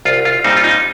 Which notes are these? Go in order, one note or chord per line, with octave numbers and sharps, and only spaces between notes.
C2 F4
F4
A#2 G3 C4 D#4
F4
D#4